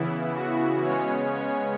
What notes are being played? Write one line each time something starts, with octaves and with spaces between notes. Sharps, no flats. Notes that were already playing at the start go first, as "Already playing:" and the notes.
Already playing: C#3 E3 B3 E4
F#4
C#3 G#3 B3 C#4 C#5
C#4 C#5